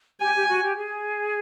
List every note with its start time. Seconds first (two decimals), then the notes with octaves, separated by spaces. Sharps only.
0.21 G4 G#5
0.35 G4
0.49 F#4
0.63 G4
0.77 G#4